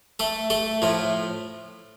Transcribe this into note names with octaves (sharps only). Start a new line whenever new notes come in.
A3 A4
A3 A4
A2 F3 A3